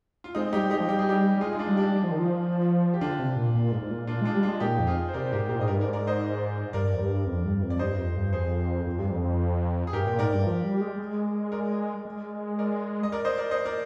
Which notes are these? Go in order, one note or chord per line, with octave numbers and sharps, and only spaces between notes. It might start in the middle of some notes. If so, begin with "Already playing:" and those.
F4
G#3 C4 D#4
G3 D#4 G4
G#3 D#4 G4
F3
G3 G4
G#4
D#4 G4
G3
G#3 F4 G#4
D#4
D4 F4
G3 D#4
D4
G3 D4
F3
D#3
F3
G4
D3 D4 F4
C3
A#2
A#2
G#2
G#2
A#2
A#2 D4 F4
G#3 D4 F4
G3
G#3 D4 F4
A#2 D#4 G4
F2
F4 G#4
C5
C3 A#4 D5
C5
G#2 G4 A#4
A#2 G4 A#4
G#2 D#5
G2 A#4 D5
G#2 A#4 D5
A#4 D5
C5 D#5
G2 A#4 D5
F2
G2
F2
G2
F2
D5
G2 C5 D#5
F2
G2
F2 G#4 C5
F2
G2
F2
G#4
G2 G4 A#4
A#2
G#2 A#4 D5
G2
F3
G3
G#3
G#3
A#4 D5
G#3
A#4 D5
D#5
A#4 D5
C5 D#5
A#4 D5
C5 D#5
A#4 D5